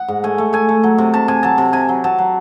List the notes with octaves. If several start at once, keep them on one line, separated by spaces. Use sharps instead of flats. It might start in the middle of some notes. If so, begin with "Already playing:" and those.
Already playing: F#5
G#2
A3 G#5
A3
A3 G#5
A3
F#3
C3
C3 A5
C3 G#5
F#3 A5
C3
C3 G#5
F#3
F#3 A5
F#3